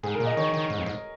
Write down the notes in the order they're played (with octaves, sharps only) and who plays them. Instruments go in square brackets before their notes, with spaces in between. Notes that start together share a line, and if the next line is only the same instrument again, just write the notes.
[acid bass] G#2 [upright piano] G#4
[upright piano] A#4
[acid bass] A#2
[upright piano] D#5
[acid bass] D#3 [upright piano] C#5
[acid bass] D#3
G#2
F2
G#2